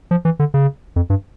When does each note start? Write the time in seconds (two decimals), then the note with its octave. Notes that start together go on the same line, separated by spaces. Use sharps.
0.11 F3
0.25 E3
0.39 D3
0.54 C#3
0.96 F2
1.10 G2